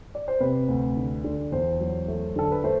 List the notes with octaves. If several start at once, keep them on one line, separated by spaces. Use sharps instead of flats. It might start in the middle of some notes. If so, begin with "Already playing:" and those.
D5
C5
C3 B4
D2
D3
D3
E2 C5
F#3
A3
D3 A4
B4
A3 C5